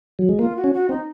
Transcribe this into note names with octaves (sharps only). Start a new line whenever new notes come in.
F#3
G#3
A#3 F4
F#4
C#4
F#4
C4 D#4